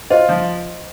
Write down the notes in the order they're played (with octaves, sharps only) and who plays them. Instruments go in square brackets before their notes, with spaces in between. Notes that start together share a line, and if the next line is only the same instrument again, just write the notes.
[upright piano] F4 [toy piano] C5 D#5
[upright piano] F3